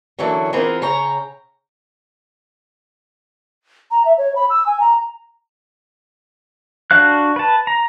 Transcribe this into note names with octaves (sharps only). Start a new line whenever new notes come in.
D3 E3 F#3 A#3 C#4
E3 B3 C4 F4 G#4 A#4
C#3 C#5 G5 A#5
A#5
E5
C#5
B5
E6
G#5
A#5
D4 F#4 F5 F#6
B4 A5
A#5